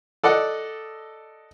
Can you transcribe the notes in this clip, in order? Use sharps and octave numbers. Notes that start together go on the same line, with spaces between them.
A4 D5 D#5 F#5